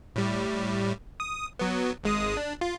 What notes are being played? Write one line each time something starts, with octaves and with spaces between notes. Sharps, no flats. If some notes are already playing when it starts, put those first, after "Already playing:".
A2 G3
D#6
F#3 B3
G#1 G#3 D#6
D4
F4